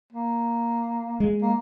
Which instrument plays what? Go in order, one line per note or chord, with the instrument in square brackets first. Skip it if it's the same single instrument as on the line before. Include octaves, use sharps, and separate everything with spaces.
[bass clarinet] A#3
[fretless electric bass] G#3
[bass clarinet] A#3